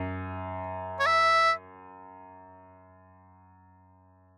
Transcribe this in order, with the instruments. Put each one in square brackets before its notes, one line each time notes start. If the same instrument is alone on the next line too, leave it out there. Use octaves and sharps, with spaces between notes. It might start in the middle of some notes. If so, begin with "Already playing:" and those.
Already playing: [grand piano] F#2
[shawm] C#5
E5